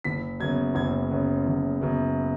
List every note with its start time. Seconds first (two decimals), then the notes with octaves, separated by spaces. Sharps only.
0.04 F#1 B6
0.40 F#2 C#3 B3 G#6
0.75 F#1 G#6
1.11 F#2 C#3 B3
1.46 F#1
1.81 F#2 C#3 B3